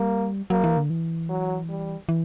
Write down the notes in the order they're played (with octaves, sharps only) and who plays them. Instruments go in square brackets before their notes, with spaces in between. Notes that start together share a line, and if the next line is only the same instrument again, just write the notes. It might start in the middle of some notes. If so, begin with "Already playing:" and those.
Already playing: [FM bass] G3 [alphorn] A#3
[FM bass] F#3 [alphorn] A#3
[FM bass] E3
D3
E3
[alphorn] F#3
G3
[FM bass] E3